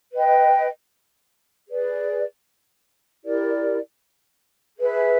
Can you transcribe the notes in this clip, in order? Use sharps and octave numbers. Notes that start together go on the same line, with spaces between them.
B4 D#5 G5
G#4 B4 D5
E4 G4 A#4 D5
G#4 B4 E5